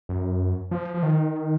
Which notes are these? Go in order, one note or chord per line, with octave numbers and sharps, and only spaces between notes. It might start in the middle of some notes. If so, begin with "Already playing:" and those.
F#2
F3
F3
D#3